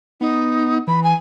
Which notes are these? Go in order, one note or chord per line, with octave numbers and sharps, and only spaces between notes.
B3 D#4
E3 B5
G#5